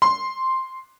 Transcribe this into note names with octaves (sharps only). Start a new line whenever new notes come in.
C6